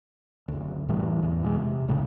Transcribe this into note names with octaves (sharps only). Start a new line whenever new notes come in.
F#1 D2
F1 A2 E3 G3
E2
E2 B2 G3 G#3
C3
C#2 A2 C#3